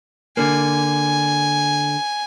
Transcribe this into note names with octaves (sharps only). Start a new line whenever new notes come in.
D3 A#3 G#5